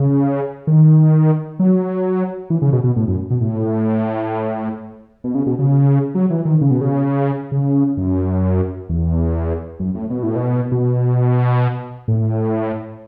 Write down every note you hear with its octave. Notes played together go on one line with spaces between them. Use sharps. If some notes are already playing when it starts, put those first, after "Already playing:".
Already playing: C#3
D#3
F#3
E3
C#3
B2
B2
A2
F#2
B2
A2
B2
C#3
B2
C#3
F#3
E3
D#3
C#3
B2
C#3
C#3
F#2
E2
F#2
A2
B2
A2
B2
B2
A2